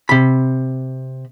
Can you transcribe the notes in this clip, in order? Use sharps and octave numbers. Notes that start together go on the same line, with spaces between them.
C3 B5